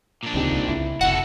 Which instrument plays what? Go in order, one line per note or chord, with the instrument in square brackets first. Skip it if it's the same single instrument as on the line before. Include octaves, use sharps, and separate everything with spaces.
[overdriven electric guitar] A#2 D4
[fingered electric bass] D2 C#3 [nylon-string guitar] C4 D#4 G4
[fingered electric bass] C2
[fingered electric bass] C#2 [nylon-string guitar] E4
[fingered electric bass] F1 A2 C3 [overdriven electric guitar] F#4 A4 [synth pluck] F#5